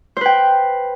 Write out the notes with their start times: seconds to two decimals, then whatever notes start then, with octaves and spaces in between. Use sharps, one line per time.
0.17 C5
0.21 B4
0.26 G5